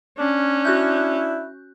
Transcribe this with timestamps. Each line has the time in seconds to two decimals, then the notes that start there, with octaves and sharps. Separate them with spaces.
0.19 C#4 D4
0.65 E4 F#4 F#6 G6